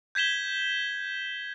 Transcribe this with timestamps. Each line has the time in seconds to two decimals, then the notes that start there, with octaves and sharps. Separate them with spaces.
0.15 G6 G#6 B6 E7 G7